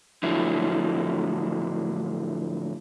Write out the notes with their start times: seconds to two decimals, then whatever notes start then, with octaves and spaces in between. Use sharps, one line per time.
0.23 A2 D3 F3 F#3 E4